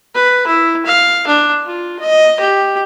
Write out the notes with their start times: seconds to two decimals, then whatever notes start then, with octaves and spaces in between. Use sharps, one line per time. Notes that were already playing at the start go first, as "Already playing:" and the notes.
0.15 B4
0.47 E4
0.86 F5
1.27 D4
1.66 F4
1.99 D#5
2.40 G4